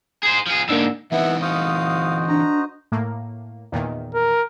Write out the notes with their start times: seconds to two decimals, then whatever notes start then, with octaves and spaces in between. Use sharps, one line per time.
0.23 G#4 C5
0.47 F3 G#4
0.69 G#2 D3 A#3 D4 E6
1.12 E3 B3 C4 D#4 E4 E5
1.42 F#4 C5 D#5 F5 D#6
2.29 D4 A#5
2.92 A2 A#3
3.72 E2 A#2 D#3
4.14 A#4